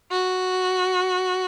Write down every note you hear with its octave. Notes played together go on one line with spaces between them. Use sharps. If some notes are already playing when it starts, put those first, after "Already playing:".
F#4